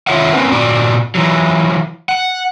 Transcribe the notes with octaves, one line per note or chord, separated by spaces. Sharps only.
D#3 F4 C#5 E5 F#5
A#3 C4 C#4 B4
A#2 F#4 D5
E3 F#3
F#5